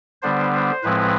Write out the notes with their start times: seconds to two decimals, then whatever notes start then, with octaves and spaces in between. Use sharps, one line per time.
0.22 D3 G3 B3 D4 C5
0.53 C5
0.83 A2 F3 G#3 C4 B4